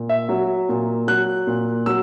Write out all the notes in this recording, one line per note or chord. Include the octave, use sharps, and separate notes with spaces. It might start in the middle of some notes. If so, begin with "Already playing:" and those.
Already playing: A#2
E5
F#3
A#2
F#3 F#6
A#2
F#3 E6